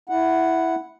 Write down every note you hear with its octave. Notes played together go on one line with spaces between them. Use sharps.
E4 F#5